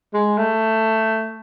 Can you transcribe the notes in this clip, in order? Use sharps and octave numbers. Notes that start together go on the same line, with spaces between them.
G#3
A3